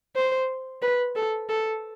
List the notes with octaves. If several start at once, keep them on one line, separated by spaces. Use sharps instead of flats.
C5
B4
A4
A4